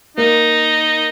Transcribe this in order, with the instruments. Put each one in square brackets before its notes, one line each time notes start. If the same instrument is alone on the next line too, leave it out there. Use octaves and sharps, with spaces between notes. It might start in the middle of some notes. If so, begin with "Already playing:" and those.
[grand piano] A#3 [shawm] D#4